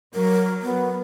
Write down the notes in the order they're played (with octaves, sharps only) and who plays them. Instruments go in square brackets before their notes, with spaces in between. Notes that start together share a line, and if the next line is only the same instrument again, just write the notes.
[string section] F#3 [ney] A#4
[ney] B3